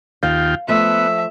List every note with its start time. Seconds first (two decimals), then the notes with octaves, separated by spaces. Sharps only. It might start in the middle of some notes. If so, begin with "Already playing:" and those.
0.23 D#2 F4 F5 G5
0.68 F3 A3 B3 E5